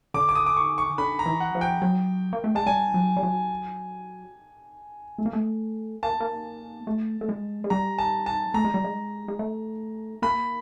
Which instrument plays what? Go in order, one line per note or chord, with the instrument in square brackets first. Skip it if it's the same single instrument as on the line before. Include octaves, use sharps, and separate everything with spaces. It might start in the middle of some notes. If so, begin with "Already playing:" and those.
[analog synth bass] D3 [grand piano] D6
[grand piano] D6
D#6
D6
C#6
C#6
[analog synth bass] D3 [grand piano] B5
[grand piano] A#5
[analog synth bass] E3
[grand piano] F#5
[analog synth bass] F3
[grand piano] G5
[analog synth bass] F#3
A#3
A3
[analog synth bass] G#3 [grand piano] A5
[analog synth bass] G3 [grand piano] G#5
[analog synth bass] F#3
G3
F#3
A3
A#3
A3
[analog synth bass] A#3 [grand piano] A5
[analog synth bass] A#3
A3
A3
G#3
G#3
[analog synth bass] G3 [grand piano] A#5
[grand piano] A5
A5
[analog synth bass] A3 [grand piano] A#5
[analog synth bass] G#3
G3
G#3
G#3
A3
[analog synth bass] A#3 [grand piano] B5